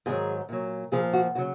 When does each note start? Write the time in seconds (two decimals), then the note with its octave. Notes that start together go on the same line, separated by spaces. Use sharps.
0.06 G#2 D#3 F#3 G#4
0.49 A#2 F#3
0.92 A#2 F3 G#4
1.13 F#4
1.35 C#3 F#3 F#4